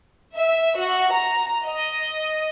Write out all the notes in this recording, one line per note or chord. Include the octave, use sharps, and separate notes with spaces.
E5
F#4
A#5
D#5